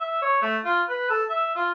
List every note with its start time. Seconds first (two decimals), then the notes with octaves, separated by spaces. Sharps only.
0.01 E5
0.22 C#5
0.42 A3
0.65 F4
0.89 B4
1.10 A4
1.30 E5
1.56 F4